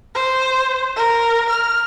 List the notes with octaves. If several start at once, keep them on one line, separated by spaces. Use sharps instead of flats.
C5
A#4
F6